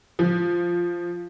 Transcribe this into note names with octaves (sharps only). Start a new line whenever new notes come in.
F3